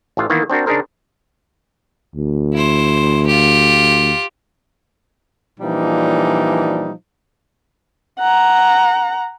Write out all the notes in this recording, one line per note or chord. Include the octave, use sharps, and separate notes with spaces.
A1 E3 F4 F5
D#3 E3 A#3 B3 E4
C4 D4 F#4 A#4
C#3 D4 D#4 G#4 A#4 C5
D2
E4 C5
F4 G4
A#2 E3 F3 G3 D4 D#4
F#5 A#5